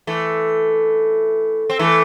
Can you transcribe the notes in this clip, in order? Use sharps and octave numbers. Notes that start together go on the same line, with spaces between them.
E3 A3
C4
E3 A3